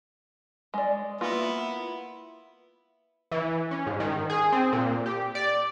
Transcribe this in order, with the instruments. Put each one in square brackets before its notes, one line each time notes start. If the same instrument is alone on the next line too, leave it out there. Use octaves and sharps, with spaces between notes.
[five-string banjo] G#3 D5
[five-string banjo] A#3 F4 [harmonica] B3 E4
[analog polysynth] E3
C#4
G#2
D#3
G#4
C4
A#2
G4
D5